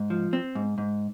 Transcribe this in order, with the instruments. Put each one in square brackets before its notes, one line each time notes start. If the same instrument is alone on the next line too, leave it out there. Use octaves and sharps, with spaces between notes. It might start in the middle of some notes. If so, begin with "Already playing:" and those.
Already playing: [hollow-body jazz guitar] G#2
F3
C4
G#2
G#2